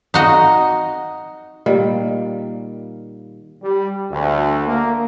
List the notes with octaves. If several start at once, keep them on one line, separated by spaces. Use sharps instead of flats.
D#4 F#4 D#5
A#2 D#3 G3 A#3
G3
D2
A#3